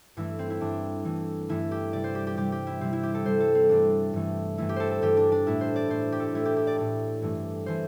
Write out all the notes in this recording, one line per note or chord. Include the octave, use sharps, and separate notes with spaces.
G2 E3 A3 E4
C4
E4
G2 E3 A3 D4
G2 E3 A3
G2 E3 A3 E4
G4
C3 G3 D5
C5
G4
G4
C3 G3 G4
G4
E4
C3 G3 C4
E4
G4
A4
C3 G3 C5
A4
C4
G2 E3 A3 D4
G2 E3 A3
G2 E3 A3 E4
G4
A4 C5
A4
G2 E3 A3 G4
D4
D4
A2 A3 E4
C5
D5
A2 A3 C5
G4
A4
G4
A2 A3 E4
G4
G4
D5
A2 A3 D5
G2 E3 A3
E3 A3 C5